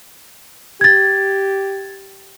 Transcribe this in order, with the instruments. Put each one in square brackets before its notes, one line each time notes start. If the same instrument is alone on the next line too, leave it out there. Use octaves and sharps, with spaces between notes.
[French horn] G4 [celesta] G#6 A6